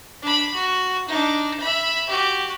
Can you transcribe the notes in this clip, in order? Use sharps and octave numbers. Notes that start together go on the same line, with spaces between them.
D4 B5
F#4
D4 D#4
E5 B5
F#4 G4